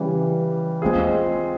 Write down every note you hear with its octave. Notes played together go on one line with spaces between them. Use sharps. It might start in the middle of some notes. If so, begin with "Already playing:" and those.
Already playing: C#3 E3 G3
G#3 C4 F4 G#4